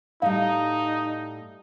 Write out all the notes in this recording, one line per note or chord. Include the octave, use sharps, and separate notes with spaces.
A2 G3 D#4 F5